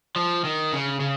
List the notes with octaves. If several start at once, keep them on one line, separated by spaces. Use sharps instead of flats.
F3
D#3
C#3
C#3